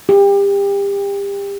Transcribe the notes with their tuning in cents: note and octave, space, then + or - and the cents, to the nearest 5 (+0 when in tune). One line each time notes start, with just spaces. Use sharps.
G4 +30